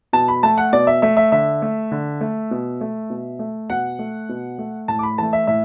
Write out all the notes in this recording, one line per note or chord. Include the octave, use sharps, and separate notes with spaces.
B2 A5
B5
A3 A5
F#5
B2 D5
E5
A3 E5
E5
D3 E5
A3
D3
A3
B2
A3
B2
A3
B2 F#5
A3
B2
A3
A2 A5
D6
B5
E3 A3 A5
E5
A2 E5